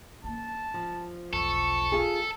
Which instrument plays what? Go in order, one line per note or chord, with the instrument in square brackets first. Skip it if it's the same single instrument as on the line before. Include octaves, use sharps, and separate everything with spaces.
[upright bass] A#3 C#4 [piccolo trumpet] A5
[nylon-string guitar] F3
[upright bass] E1 B1 [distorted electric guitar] A4 [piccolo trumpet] C#6
[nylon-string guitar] F4 G#4